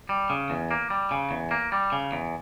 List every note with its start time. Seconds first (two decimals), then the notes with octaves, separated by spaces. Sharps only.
0.09 G3
0.30 C#3
0.50 E2
0.71 A#3
0.90 G3
1.11 C#3
1.31 E2
1.51 A#3
1.72 G3
1.92 C#3
2.12 E2